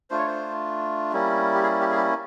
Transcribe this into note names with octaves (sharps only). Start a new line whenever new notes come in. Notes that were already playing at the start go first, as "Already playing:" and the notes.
A3 D4 F4 C5
C#5
C5
G3 A#3 C#4 E4
G4
G#4
G4
G#4
G4